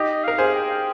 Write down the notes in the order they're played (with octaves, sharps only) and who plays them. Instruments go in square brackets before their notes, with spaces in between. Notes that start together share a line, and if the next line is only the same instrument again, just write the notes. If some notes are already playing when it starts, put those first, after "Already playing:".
Already playing: [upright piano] D#4 G4 [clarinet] D#5
[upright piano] A#4 [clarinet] F5
[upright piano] G#4 C5
[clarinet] F5
G5